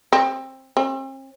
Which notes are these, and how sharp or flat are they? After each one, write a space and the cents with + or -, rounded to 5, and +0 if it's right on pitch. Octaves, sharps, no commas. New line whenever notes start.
C4 +20
C4 +45